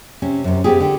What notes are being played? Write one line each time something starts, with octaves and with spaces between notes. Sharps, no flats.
C3 C#4
F#2 C3
B3 C4 F4 G4 G#4
D3 G4